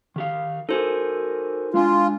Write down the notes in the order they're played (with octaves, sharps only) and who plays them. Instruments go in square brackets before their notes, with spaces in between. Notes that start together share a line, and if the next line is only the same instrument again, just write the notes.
[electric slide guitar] D#3 G4 F5
[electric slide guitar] D#4 F#4 A#4 [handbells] A4 C5 G#5
[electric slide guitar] G#3 D4 G#5 [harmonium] F4